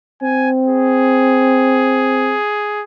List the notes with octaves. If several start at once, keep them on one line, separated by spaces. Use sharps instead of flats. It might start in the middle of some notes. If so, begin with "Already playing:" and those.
C4 G#5
G#4